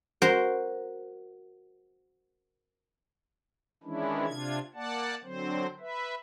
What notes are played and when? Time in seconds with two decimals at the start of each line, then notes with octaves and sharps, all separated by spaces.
0.22 F#4 A#4 C5
3.83 D#3 E3 G#3 C#4 D4 E4
4.26 C3 D4 F4 G#6
4.74 A#3 D5 F#5 A5
5.23 D3 F#3 C4 C5
5.80 B4 E5